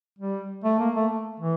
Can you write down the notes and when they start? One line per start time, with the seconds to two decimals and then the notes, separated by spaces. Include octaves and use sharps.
0.18 G3
0.64 A3
0.79 A#3
0.95 A3
1.40 E3